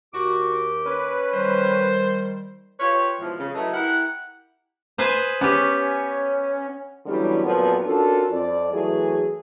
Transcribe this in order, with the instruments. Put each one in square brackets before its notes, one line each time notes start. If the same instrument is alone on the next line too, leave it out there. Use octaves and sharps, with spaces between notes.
[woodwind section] D#2 G4 D6 [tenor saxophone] F#4
[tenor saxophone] C#4 [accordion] B4
[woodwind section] D#3 G3 [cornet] C5
[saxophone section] F4 G4 B4 C#5
G#2 B2 E3 F3
C#3
F#3 A3 D#4 E4 A4 B4
E4 G4 A#4 F#5
[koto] G#4 B4 C5
[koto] B3 G4 [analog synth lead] C#4
[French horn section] D3 E3 F#3 G3 B3 C#4
F2 A#2 F3 F#3 B3
C#4 D4 F4 F#4 A4 A#4
F2 D5
E3 F#3 A3 G#4